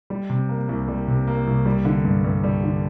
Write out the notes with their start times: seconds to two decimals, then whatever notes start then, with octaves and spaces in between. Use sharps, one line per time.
0.10 G3
0.30 C3
0.49 A#3
0.69 C2
0.88 G3
1.07 C3
1.27 A#3
1.47 C2
1.66 G3
1.85 D3
2.05 G2
2.24 G2
2.44 G3
2.64 D3